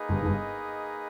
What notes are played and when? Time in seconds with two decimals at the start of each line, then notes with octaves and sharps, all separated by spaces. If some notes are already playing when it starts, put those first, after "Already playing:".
Already playing: A#3 D#4 G#4 B4 D#5
0.09 G1 G2
0.21 G#2
0.25 G1 G2